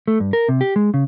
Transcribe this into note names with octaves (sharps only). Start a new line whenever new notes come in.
A3
G2
A#4
C3
G4
G#3
C#3